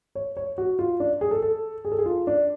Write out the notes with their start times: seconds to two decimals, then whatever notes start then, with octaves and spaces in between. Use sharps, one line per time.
0.15 C#5
0.37 C#5
0.58 F#4
0.79 F4
1.00 D4
1.21 G#4
1.31 A4
1.42 A4
1.85 G#4
1.92 A4
1.99 G#4
2.06 F4
2.27 D4